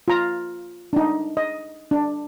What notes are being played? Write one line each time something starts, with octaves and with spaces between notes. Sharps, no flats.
F4 A#5
D4 D#4
D#5
D4